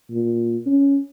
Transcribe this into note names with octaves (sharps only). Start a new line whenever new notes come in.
A#2
C#4